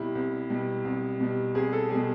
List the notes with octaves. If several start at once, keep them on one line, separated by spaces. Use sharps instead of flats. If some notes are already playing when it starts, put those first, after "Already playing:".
Already playing: C2 B2 G3 E4
C2
B2 G3
C2
B2 G3
C2 G#4
A4
B2 G3 G#4